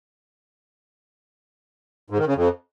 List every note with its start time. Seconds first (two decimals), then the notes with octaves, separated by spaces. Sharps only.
2.10 G#2
2.19 D#3
2.27 C#3
2.35 F2